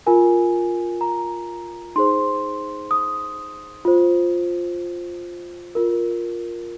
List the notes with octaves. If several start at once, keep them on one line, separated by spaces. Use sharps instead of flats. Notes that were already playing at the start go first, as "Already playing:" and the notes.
F4 A#4 G#5
A#5
D#4 G#4 C5 C6
D#6
F4 C5
F4 A#4